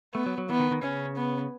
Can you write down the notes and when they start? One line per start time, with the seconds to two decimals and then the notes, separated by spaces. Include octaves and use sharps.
0.15 A3 B3
0.26 F#3
0.38 F#3
0.49 E3 B3
0.60 D#3
0.71 D#3
0.82 C#3 C#4
1.16 B3